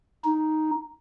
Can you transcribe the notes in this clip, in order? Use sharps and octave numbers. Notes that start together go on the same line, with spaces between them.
D#4